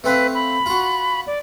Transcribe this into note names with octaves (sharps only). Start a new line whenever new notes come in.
A3 C4 B4 F5
B5
F4 F#4
D5